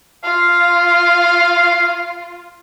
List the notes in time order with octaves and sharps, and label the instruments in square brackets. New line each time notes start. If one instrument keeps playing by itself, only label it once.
[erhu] F4 [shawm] F5